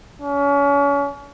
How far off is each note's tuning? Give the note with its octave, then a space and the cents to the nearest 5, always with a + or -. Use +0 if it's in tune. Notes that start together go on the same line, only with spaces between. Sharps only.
C#4 +35